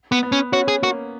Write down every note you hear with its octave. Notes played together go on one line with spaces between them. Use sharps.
B3
B3
C#4
C#4 F#4
G#4
A#3 F#4